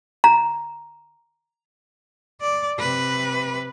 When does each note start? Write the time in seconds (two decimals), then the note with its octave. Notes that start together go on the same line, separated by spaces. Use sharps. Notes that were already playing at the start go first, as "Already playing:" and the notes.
0.24 A#5
2.41 D5
2.79 C3 B4